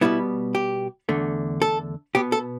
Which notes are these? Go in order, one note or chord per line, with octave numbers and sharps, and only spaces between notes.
B2 G3 B3 E4
G4
E2 D3 A3
A4
B2 B3 G4
A4